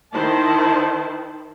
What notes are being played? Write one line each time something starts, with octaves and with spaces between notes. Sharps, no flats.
D#3 E4 C5 A5